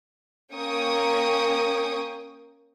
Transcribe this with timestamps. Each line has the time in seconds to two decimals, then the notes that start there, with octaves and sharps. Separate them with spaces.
0.54 A#3 C#4 G5 C#6 D#6